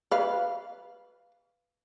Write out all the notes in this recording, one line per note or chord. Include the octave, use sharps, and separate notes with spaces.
B4 F5